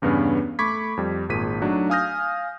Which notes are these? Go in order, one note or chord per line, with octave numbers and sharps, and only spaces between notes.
E2 G2 C#3 B3 C#4
A3 B5 C#6 D6 G#6 B6
F2 G3
G#1 A#2 G#4 B6 D#7
F#3 A3 D4 D#4 F#4
F5 G#5 D#6 F6 G6 A#6